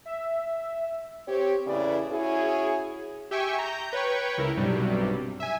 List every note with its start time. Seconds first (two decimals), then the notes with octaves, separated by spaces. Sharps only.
0.05 E5
1.28 C4 G4 C#5
1.67 E2 A2 C#3 E4 B4 D5
2.12 C#4 E4 F#4 G#4
3.31 G4 E5 G5 G#5 C#6
3.58 A#5 G6
3.93 B4 C#5 G5 C#6
4.38 C#2 E4 A#4
4.57 B1 G2 C3 F#3 G3
5.40 E5 G#5